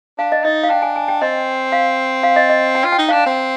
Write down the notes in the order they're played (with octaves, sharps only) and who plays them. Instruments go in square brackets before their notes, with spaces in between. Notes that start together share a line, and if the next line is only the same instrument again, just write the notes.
[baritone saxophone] D4 [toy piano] F5
[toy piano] D#5
[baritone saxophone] D#4 [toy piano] D#5
[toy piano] F5
[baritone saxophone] D4 [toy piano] G5
[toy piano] G#5
G#5
G5
[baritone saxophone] C4 [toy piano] D#5
[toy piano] F5
F5
D#5
D#5
G5
[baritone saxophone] F4
[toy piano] G5
[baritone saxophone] D#4
[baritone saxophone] D4 [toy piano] F5
[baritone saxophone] C4